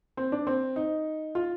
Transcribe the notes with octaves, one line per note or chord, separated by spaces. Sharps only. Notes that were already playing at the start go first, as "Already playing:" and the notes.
C4
D4
C4
D#4
F4